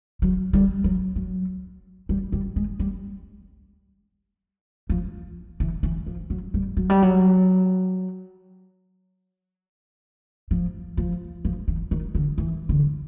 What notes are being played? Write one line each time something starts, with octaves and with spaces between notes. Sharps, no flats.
F#3
G3
F#3
F#3
G3
G3
G#3
G3
F3
E3
E3
F3
F#3
G3
F#3
G3
F#3
F3
F3
F3
E3
D#3
D3
E3
D3